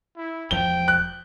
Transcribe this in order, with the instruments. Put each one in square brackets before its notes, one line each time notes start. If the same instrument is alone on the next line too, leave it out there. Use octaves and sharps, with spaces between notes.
[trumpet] E4
[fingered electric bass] E1 F3 [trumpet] G5 [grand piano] G7
[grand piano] F#6